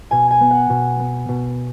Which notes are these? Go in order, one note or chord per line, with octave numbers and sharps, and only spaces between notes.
B2 G#5
G#5
B3
F#5
B2
B3
B2